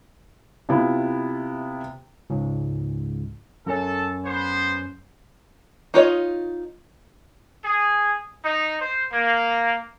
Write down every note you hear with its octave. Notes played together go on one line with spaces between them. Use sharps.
C3 B3 E4 F4
C#2 G#2
F#2 C#4 A4 A5
B3 C5
D#4 F4 C#5 D#5
G#4
D#4
C5
A#3